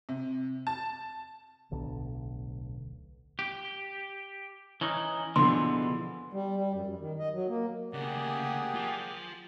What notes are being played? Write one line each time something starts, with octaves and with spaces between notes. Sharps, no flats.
C3
A5
D1 B1 D3
G4
E3 C#4 D#4
E2 B2 D3 E3 F3 C6
G3
G3
F#2
F#2
D#3
D#5
F#3
A#3
D2 C#3 A#3 G4 G#4 D5 F#5
F4 A5